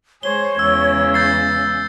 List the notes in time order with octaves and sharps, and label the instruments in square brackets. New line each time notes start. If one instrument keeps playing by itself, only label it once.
[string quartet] G#3 G#4 C5 [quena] C#5 [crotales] G7
[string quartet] E2 C#3 G#3 [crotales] E6
[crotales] G6 A6 C7